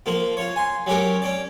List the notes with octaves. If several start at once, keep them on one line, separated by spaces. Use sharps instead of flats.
F3 A#3 F4
F4 C#5
G#5 C6
F#3 C#4 G4 A#4
C#4 D5